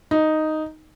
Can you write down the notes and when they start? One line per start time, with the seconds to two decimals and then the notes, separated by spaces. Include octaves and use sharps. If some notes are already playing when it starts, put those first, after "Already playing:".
0.11 D#4